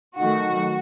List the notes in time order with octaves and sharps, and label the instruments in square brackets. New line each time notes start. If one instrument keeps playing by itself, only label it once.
[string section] D#3 F#3 A3 F#4